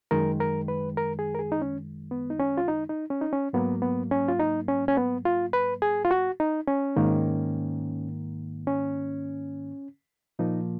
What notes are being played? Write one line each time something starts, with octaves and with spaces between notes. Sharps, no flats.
F#2 D#3 G#3 A#4
A#4
B4
A#4
G#4
A#4
G#4
D#4
C#4
B3
D#4
C#4
F4
D#4
D#4
C#4
D#4
C#4
G#2 F#3 A#3 B3
B3
C#4
F4
D#4
C#4
C#4
B3
F4
B4
G#4
F4
F#4
D#4
C#4
G#2 D#3 A#3
C#4
A#2 F3 A#3 D#4